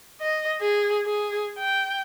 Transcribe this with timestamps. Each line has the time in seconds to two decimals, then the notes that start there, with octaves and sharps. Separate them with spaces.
0.21 D#5
0.61 G#4
1.06 G#4
1.59 G5